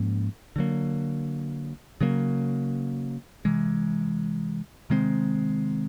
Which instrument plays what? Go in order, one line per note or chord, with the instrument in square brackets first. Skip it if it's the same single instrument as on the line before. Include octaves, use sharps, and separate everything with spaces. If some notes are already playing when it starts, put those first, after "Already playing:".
Already playing: [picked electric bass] G#2 F3 A#3 C#4
D3 F#3 A#3
C#3 F#3 A#3
C3 E3 G#3
C3 D#3 G#3 C4